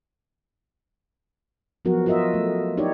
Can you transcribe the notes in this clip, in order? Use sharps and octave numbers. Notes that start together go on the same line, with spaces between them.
F3 F#3 B3 F#4 A#4
F4 F#4 A#4 D#5 E5
A3
D#4 E4 G4 C#5 D5